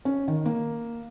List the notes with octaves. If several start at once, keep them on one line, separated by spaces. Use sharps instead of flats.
C#4
D#3
A#3